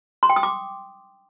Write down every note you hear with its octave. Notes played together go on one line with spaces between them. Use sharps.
C6
G5
D#6
D6